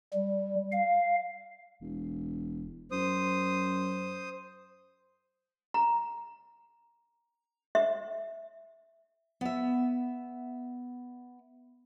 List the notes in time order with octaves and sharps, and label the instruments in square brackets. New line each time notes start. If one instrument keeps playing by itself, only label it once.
[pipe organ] G3
F5
[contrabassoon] E1
[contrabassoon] F#2 [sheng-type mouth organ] C5 D#6
[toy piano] A#5
E5
[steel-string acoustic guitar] B3 E5